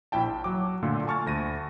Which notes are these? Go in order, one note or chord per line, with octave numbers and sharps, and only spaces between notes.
A#1 E4 G5 A5
G5
F#3 D6
A#2 D3 A3 A#3 F4 A4
G#5 A5 C#6 F6 A6
D2 A#6 D#7